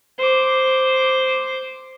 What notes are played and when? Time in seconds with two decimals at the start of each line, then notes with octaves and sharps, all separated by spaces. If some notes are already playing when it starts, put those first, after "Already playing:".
0.18 C5 D6